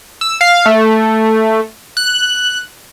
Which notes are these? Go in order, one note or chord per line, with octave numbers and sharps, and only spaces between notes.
E6
F5
A3
F#6